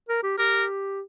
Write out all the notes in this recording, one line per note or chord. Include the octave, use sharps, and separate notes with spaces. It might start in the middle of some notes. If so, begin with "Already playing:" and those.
A#4
G4
G4 A#4